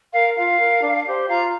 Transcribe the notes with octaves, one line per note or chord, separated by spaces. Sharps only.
A#4 F5
F4 F5
A#4
D4
G4 C5
F4 F5 A#5